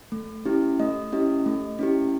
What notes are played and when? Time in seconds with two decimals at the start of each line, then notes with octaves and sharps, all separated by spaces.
0.12 A3
0.45 C#4 E4 G4
0.80 A3 D#5
1.12 C#4 E4 G4 D#5
1.46 A3
1.79 C#4 E4 G4